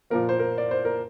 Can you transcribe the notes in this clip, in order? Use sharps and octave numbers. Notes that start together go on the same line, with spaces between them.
A#2 F3 A#3 A#4
C5
A#4
D5
C5
A#4